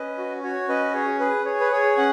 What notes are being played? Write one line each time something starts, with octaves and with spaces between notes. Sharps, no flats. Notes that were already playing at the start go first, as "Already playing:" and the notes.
Already playing: C#4 B4 D#5
F#4
F#4 C#5
C#4 B4 D#5
G#4 C#5
G#4 B4
G#4 C#5
B4
G#4 C#5
C#4 F#5